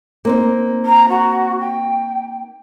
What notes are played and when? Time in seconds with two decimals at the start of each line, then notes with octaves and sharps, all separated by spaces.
0.25 A#3 C4 D#4
0.86 A#5
1.09 F#4
1.61 G5